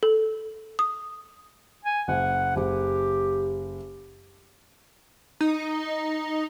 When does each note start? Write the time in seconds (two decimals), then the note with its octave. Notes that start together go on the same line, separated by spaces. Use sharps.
0.03 A4
0.79 D#6
1.85 G#5
2.08 F#1 F#5
2.56 F#1 G4
5.41 D#4